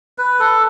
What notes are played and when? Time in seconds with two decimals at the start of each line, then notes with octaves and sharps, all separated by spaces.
0.18 B4
0.40 A4